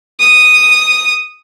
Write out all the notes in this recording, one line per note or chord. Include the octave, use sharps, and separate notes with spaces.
D#6